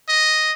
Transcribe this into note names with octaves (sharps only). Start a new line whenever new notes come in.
D#5